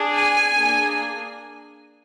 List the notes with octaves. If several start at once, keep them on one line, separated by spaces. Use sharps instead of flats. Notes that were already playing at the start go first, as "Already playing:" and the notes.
Already playing: D4 G#4
G#5
A#3 D4 G#4